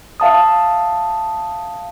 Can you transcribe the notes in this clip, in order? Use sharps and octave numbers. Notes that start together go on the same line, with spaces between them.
E5 F5 A5 D#6